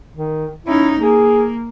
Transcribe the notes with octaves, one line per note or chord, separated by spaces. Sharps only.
D#3
C#4 D#4 E4
A#3 G#4